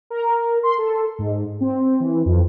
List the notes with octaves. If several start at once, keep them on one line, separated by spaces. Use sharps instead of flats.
A#4
C6
A4
G#2
C4
E3
F2